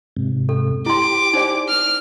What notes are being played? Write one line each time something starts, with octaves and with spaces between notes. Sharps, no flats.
G#2 C3
A4
E4 G4 C6 D6
D#4 C5 D5
F6